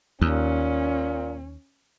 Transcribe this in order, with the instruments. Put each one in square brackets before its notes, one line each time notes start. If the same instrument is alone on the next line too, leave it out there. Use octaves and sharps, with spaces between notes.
[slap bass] D#2 [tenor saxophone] A#2 [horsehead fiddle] C#4